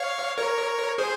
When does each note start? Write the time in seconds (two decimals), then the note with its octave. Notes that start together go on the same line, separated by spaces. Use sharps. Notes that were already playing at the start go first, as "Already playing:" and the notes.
Already playing: C#5 F5
0.38 A#4 C#5
0.98 G#4 C5